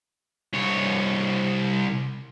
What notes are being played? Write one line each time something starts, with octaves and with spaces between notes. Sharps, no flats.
C2 C#5